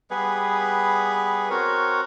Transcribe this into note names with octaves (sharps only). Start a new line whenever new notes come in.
G3 B3 G#4 B4
C4 F#4 A#4 C#5